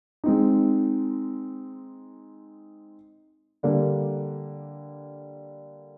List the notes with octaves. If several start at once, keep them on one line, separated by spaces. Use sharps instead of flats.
G#3 C4 D#4
D3 G3 A#3 D4